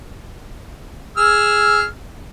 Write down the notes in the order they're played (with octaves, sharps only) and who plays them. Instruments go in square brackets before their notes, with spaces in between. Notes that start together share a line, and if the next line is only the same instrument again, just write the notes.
[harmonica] G#4 E6 F6